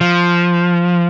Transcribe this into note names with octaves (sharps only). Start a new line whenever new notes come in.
F3